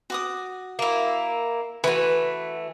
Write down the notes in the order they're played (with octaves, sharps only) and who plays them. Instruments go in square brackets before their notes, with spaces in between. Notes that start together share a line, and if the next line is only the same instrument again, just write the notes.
[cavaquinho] F#4 D6 D#6
[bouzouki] A#3 E4
[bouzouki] E3 A3 [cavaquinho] F#4 B4